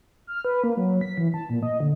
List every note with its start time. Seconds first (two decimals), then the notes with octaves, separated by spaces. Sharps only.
0.27 F6
0.45 B4
0.64 A#3
0.77 F#3
1.01 B6
1.17 E3
1.34 A5
1.49 A#2
1.63 D#5
1.80 D3